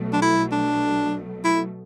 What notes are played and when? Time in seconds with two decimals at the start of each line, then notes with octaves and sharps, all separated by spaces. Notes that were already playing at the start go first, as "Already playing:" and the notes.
Already playing: B1 B2 F#3 A3
0.13 D4
0.22 E4
0.52 D4
1.45 E4